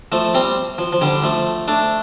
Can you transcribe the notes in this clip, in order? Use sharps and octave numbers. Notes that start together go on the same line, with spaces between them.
F3 A3
G3 C4
F3
F3
D3 G3
F3 A3
A3 D4